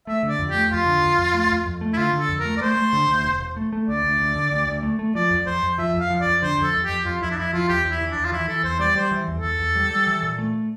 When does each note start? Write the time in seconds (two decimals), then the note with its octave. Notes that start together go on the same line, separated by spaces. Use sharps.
0.07 A3 E5
0.23 D3
0.28 D5
0.39 F2
0.49 G4
0.54 A3
0.70 F2 F4
0.86 D3
1.02 F2
1.18 F2
1.34 A3
1.49 F2
1.66 F2
1.81 A3
1.93 E4
1.97 D3 F4
2.13 D3
2.19 A4
2.29 F2
2.39 A#4
2.45 A3
2.57 D5
2.61 A3 C5
2.77 A3
2.93 D3
3.08 D2
3.24 E1
3.40 E1
3.56 A3
3.73 A3
3.88 D2 D5
4.04 D2
4.19 D2
4.36 D3
4.51 D2
4.67 D2
4.83 A3
4.99 A3
5.15 F3 D5
5.30 F2
5.46 F2 C5
5.63 F2
5.78 F3 E5
5.94 F2
5.99 F5
6.10 F3
6.21 D5
6.26 F2
6.42 D3 C5
6.58 F2
6.63 A4
6.74 F2
6.84 F2 G4
7.05 F2 F4
7.21 F2 E4
7.31 D4
7.37 F2 E4
7.53 F3 F4
7.69 E2 G4
7.85 E2
7.90 E4
8.01 E3
8.11 D4
8.16 E2
8.25 F4
8.32 E3 E4
8.48 E3 A4
8.64 E2 C5
8.79 G3 D5
8.95 G3 C5
9.11 E3
9.28 E2
9.37 A4
9.44 E2
9.59 E2
9.75 G3
9.91 G3
10.07 E3
10.23 A#2
10.39 A3